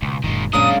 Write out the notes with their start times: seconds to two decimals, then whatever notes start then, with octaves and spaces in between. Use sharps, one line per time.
0.02 C#2 B2
0.24 F#1 A#2 D#3 G#3
0.53 F#2 A#2 G#3 A#3 C#4 D4 A#4 D#6